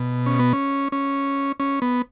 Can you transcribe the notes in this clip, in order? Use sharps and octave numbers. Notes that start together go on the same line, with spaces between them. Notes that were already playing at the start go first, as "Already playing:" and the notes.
Already playing: B2
C#4
B3
C#4
C#4
C#4
B3